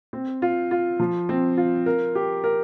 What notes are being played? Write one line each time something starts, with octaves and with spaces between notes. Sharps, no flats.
C4
F4
F4
F3
C4
F4
A#4
G4
A#4